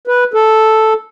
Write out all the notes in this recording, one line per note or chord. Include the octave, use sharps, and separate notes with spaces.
B4
A4